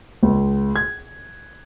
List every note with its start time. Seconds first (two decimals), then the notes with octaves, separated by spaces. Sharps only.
0.23 C#2
0.76 G#6